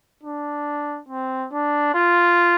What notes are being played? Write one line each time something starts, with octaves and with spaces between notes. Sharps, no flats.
D4
C4
D4
F4